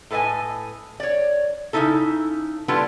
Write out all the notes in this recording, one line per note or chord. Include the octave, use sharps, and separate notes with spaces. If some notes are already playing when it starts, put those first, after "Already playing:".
A2 A4 B4 D#5 G#5
C#5 D5
C#3 C4 D#4 E4 A4
G3 B3 D4 E4 F4 A4